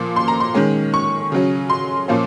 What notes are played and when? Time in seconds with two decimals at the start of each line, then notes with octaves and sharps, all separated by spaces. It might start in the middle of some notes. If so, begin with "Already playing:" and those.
Already playing: A#2 F3 A#3
0.16 C6
0.28 A#5
0.40 C6
0.54 D#3 G#3 C#4
0.94 C#6
1.32 C#3 F#3 C#4
1.70 C6
2.08 A#2 F3 A#3 C#4